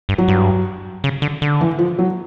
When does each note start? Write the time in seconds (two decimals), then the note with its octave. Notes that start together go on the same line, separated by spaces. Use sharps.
0.09 G2
0.18 F#3
0.28 G2
1.04 C#3
1.22 D3
1.42 D3
1.61 E3
1.79 F3
1.99 F#3